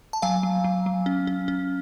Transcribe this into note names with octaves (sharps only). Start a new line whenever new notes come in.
A5
F#3 F5 G#5
F#3
F#3
F#3
C#4
C#4
C#4